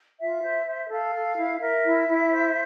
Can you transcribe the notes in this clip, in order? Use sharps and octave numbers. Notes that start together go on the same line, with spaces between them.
F4 E5
C5
C5
A4 F5
A4
E4
A#4 E5
E4
E4
C5